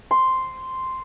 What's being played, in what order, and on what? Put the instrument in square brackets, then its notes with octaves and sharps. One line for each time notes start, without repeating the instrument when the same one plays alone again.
[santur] C6